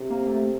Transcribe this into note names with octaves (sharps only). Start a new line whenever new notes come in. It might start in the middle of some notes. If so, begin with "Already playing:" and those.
Already playing: C3
A#3
A3